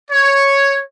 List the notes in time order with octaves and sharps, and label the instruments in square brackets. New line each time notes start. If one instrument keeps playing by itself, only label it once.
[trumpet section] C#5